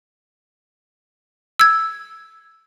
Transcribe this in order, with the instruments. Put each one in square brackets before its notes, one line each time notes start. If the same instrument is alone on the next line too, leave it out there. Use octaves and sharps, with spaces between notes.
[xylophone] E6 G#6